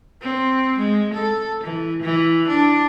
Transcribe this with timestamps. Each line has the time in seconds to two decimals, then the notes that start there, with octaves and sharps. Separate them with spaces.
0.21 C4
0.78 G#3
1.13 A4
1.63 E3
2.02 E3
2.48 D4